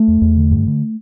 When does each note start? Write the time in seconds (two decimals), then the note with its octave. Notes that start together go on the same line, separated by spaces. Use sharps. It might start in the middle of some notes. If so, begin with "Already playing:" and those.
Already playing: A3
0.08 E2
0.22 E2
0.37 D3
0.51 G2
0.67 D3